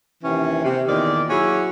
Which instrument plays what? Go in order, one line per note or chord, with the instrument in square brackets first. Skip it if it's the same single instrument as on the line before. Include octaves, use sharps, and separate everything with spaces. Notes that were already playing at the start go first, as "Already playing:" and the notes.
[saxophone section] D#2 C3 E3 C#4
C3
E2 A#2 D#3 D5
F#3 C#4 E4 F#4 G#4